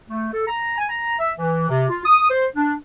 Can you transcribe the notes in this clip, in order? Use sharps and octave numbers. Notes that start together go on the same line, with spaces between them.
A3
A4
A#5
G#5
A#5
E5
E3
C3
F4
D#6
C5
D4